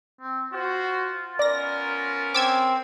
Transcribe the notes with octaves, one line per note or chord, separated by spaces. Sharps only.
C4
F4 F#4 C5
B3 C#4 A#4 D5 A#6
C4 D6 E6 G#6